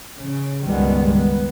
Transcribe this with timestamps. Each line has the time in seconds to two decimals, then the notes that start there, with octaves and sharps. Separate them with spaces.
0.18 C#3
0.63 C#2 G2 D#3 G3 G#3 B3
1.14 B3